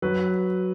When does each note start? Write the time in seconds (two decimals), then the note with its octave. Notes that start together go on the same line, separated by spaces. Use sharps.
0.02 F#3 B4